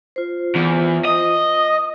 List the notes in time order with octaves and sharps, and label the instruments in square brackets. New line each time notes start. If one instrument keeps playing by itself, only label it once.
[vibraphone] F4 C5
[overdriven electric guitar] E2
[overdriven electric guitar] D#5 [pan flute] D#6